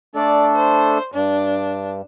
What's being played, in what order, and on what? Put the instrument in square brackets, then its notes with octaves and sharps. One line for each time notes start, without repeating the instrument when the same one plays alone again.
[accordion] A3 D4 A4 [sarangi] D5
[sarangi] C5
[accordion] G2 [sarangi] D4